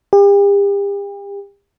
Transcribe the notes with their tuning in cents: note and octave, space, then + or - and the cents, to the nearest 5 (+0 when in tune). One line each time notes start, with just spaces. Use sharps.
G4 +40